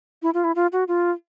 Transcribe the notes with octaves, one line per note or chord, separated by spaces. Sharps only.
E4
F4
E4
F4
F#4
F4